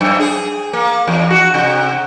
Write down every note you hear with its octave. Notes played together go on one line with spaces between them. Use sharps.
F#2
G#4
A#3
E2
F#4
C3